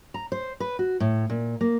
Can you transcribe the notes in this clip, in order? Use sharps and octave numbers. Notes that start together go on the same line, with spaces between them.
A#5
C5
B4
F#4
A2
A#2
A#3